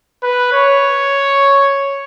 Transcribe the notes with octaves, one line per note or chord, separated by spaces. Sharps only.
B4
C#5